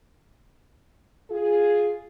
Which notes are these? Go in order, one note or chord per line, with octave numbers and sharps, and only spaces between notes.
F4 G#4